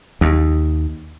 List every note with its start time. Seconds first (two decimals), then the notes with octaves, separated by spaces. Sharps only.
0.21 D#2